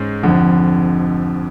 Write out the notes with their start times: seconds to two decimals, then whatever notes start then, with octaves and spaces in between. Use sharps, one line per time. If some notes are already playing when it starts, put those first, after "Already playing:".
Already playing: G#2 G#3 C#4
0.23 F1 F2 D3